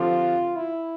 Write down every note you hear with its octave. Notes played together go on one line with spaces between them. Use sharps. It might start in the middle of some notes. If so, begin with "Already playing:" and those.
Already playing: D3 F3 C4 F4 G4
E4